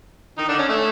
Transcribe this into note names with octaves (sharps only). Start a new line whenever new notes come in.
D#3 D#4
D3 D4
C#4
A3